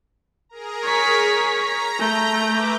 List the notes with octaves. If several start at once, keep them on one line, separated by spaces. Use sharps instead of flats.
G#4 A#4 A#5
C#5 B6
A#5
A3 G6
B4 E5 D6